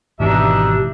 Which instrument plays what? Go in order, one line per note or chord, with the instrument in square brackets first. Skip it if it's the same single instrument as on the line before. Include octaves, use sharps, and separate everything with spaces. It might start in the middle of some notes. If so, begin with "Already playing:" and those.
[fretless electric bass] G#1 B2 E3 [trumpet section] D4 D#4 E5 [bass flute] G4